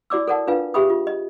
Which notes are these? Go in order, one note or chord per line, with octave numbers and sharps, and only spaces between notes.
E4 F#4 D5 D6 E6
A4 A#4 D5 F#5 A5
D4 F4 B4 F5
G4 G#4 E5 G5 B5 D#6
F4
D#5